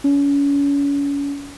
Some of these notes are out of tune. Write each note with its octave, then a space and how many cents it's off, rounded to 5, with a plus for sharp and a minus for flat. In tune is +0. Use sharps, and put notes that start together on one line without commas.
C#4 +35